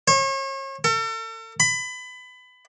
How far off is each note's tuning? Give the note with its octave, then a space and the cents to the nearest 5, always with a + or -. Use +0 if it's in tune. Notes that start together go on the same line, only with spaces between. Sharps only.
C#5 -40
A4 +40
B5 +25